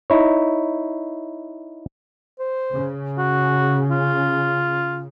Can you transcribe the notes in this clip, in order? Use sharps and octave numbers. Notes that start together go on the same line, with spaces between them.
D#4 E4 C#5
C5
C#3
F#4
F4